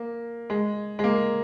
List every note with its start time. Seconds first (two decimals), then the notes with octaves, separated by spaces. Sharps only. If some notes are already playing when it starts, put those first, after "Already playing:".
Already playing: A#3
0.50 G#3
0.99 G#3
1.04 A#3